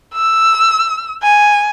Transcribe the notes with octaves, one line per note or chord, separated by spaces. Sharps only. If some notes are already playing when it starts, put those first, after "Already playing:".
E6
G#5